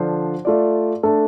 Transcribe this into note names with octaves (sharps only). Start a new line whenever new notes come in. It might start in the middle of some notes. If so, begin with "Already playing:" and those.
Already playing: D3 F3 D4 F4 C5
A3 F4 D5
A3 D4 A4